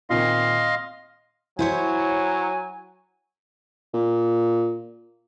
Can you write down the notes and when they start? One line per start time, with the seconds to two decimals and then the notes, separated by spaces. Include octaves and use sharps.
0.10 A#2 D#3 C4 D#5 F5 C6
1.59 F#3 E4 C5 C#5 G#5
3.94 A#2